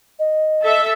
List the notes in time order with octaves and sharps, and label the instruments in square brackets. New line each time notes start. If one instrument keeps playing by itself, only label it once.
[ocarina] D#5
[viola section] A4 E5